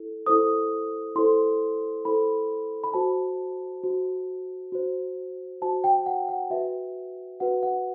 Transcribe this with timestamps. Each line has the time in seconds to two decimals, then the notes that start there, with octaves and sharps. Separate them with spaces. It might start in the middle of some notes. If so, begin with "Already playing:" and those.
Already playing: E4 A4
0.26 E4 A4 C5 D#6
1.16 E4 A4 C5 C6
2.05 E4 A4 C5 B5
2.84 B5
2.94 F#4 C5 A5
3.83 F#4 C5
4.72 F#4 C5
5.62 F#4 C5 A5
5.84 G5
6.06 F#5
6.29 F#5
6.50 F#4 B4 E5
7.40 F#4 B4 F#5
7.63 F#5